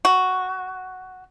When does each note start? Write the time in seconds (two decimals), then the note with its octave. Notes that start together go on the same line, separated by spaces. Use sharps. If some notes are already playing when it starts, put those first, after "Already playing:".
0.05 F#4